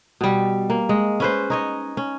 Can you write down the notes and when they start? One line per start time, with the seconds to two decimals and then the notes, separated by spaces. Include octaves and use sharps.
0.21 B2 G3
0.70 A#3
0.89 G#3
1.20 C#4 B4 C5
1.50 D#4 C#5 D#5
1.97 C#4